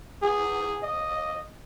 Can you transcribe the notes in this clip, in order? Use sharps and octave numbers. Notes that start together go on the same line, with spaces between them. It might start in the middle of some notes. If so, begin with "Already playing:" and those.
G#4
D#5